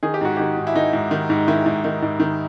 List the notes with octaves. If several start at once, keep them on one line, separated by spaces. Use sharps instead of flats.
D#3 G#4
G4
G#2 F#4
D#3 G4
G#2
E4
D#3 D#4
G#2
D#3
G#2
D#3 E4
G#2
D#3
G#2
D#3